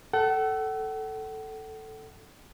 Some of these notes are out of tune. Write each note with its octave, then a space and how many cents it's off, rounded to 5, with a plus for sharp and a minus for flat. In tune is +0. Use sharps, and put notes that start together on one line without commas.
A4 +0 F#5 +40